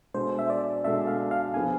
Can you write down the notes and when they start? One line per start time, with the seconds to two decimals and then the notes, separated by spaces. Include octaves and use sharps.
0.14 B2 G#3 D4 A4 C5
0.39 E5
0.50 D5
0.84 B2 G#3 D4 A4 E5
1.07 F5
1.31 F5
1.54 F3 B3 D4 G#4 G#5